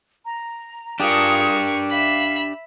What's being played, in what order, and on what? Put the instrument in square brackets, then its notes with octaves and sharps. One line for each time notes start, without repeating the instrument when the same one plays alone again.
[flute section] A#5
[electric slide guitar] D4 G4 [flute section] F4 G#4 D#6 [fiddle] A#4 C#6
[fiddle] E5 B5 [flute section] F5